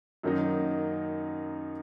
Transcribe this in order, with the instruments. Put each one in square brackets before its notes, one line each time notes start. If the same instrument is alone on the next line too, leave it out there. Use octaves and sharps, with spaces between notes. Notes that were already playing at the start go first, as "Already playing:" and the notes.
[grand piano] F#2 D#3 F#3 A#3 D#4